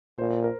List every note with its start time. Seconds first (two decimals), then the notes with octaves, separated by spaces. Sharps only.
0.18 A#2 C5
0.44 A#4